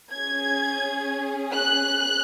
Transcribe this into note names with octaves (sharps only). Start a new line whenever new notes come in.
C#4 G#4 G#6
F#6